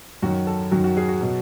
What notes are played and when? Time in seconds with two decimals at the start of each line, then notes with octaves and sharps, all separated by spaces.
0.23 F#2 D#3 F#3 F#4
0.47 A4
0.71 F#2 D#3 F#3 F#4
0.84 F#4
0.97 G#4
1.09 F#4
1.21 B2 F#3